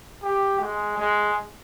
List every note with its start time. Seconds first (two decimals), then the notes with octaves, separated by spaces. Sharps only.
0.23 G4
0.60 G#3
0.97 G#3